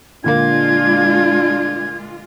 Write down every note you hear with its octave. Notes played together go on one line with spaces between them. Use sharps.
A#2 D3 G#3 A#3 D4 F4 G#6